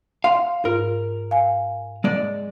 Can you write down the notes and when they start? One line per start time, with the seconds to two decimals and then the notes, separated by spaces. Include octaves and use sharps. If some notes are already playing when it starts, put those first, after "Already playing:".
0.24 F5 C6
0.65 G#2 F4 A#4
1.31 F5 G#5
2.04 G#3 D5